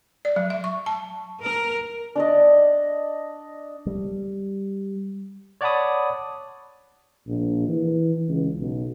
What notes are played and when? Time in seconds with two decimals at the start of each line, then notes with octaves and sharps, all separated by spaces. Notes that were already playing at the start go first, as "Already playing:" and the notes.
0.25 D5
0.36 F#3
0.50 E5
0.64 C#6
0.86 A5
1.42 A#4
2.16 D4 D5 D#5
3.86 G3
5.61 C#5 D5 F#5 A5 B5 D#6
7.27 A#1
7.68 E3
8.28 C#2
8.59 B1